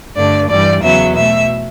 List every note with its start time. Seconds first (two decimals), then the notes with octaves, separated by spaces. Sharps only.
0.15 G2 D3 A3 D5
0.49 G2 E3 G3 D5
0.82 E2 C#3 F#3 B3 E5
1.15 B2 A3 E5